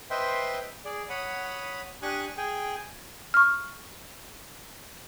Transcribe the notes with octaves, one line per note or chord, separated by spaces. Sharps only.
B4 C5 D#5 E5 G5 C6
G#4 D5
C#5 F#5 B5 D#6
D4 G4 G#5 C#6 D#6 F#6
G#4 G5 G#5
C#6 F6